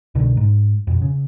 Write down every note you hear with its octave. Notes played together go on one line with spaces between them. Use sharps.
C2 B2 D3 D#3
G#2
F2 B2
C#3